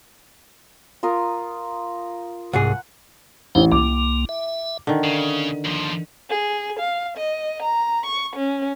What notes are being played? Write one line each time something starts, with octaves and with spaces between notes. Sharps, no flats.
F4 A#4 D#6
C2 G#2 G#4 F#5
A1 D#4 C5 G5
C2 A#3 D6
E5
D3 D#3
C#3
D#2 F3
G#4
F5
D#5
A#5
C#6
C#4